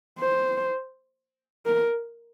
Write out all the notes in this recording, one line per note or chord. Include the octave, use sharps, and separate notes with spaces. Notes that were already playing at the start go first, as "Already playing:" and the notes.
C5
A#4